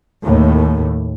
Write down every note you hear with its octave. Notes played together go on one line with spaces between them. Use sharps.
D#2 A2